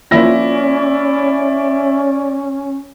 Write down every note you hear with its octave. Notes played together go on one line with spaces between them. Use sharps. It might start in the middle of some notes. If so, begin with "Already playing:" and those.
F3 A#3 C#4 E4 F4 D5 A#6